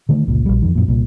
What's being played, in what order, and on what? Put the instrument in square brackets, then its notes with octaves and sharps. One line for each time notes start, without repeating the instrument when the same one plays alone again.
[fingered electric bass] D3 D#3 A3
G1 C#2 A#2
A#1 G3
F2 D#3
F#2 A#2
C2 A#2